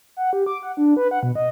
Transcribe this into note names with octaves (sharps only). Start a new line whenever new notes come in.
F#5
G4
D6
F#5
D4
B4
F#5
B2
D#5